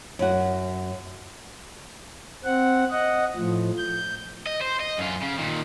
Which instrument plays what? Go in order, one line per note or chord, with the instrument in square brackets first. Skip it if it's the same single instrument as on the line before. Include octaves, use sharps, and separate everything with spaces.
[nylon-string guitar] F#2 F#4
[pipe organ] C4 F#5
D#5 F#5
A2 F3
G6
[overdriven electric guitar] D#5
C5
D#5
F#2 F4
C#3
A#2 D#3